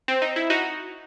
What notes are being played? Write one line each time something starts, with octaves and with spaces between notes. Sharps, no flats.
C4
D#4
E4
D#4 F#4